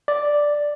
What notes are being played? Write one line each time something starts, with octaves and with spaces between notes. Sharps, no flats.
D5